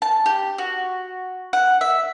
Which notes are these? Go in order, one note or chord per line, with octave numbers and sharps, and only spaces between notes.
A5
G4
F#4
F#5
E5